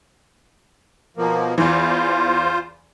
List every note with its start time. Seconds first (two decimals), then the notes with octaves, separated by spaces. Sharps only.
1.17 B2 F3 A#3
1.58 E2 E3 F4 C5